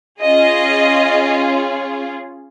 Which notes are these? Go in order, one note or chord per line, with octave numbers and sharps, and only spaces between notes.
C#4 F4 G#4 D#5